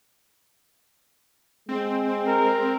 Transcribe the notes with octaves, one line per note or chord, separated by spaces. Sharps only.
G#3 C4
A#4